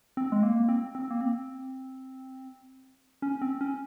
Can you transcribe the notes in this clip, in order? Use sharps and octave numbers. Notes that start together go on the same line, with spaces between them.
C4
G#3
A#3
C4
C4
A#3
C4
C#4
C4
C#4